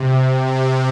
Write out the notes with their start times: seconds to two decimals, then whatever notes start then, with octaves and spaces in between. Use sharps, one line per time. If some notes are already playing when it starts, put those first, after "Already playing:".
Already playing: C3
0.46 C3